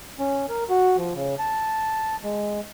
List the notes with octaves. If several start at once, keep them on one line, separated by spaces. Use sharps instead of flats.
C#4
A#4
F#4
F3
C#3
A5
G#3